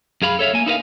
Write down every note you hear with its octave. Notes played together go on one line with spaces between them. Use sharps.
F#2 G#4 F5 B5
A4 C#5 E5 F5
A#3 G#5
D#4 E4 A#4 B4 F5